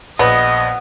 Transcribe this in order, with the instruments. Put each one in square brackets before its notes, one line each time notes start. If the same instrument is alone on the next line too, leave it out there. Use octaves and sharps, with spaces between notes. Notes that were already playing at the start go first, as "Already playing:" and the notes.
[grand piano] A#1 [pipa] B3 [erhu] D#5